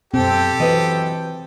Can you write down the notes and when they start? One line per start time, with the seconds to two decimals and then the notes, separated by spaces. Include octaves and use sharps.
0.14 F#2 B2 C4 G4 A4 G5
0.60 F#2 E3 B4 D#5